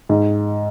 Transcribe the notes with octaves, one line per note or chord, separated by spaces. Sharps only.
G#2